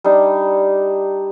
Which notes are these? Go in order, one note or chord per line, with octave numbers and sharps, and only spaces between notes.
G3 D4 D#4